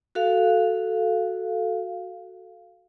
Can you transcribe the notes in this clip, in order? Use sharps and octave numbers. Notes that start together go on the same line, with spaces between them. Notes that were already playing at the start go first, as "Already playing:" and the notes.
F#4 A4 F5